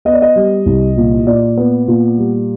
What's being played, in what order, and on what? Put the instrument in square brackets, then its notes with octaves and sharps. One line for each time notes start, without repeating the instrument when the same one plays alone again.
[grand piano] B3 D#5
D5
D#5
G3
C2
A#2
A#2 D5
B3
A#2
G3